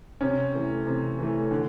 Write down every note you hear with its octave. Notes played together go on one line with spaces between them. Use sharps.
C3 C#4
E3 A3
C3
E3 A3
D3